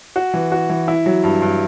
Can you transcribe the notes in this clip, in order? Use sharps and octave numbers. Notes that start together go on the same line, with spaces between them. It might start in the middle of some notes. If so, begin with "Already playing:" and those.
F#4
E3
F#4
E3
E4
F#3
G2
G2